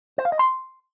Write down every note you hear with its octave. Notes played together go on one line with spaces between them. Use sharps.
C5
F5
D#5
C6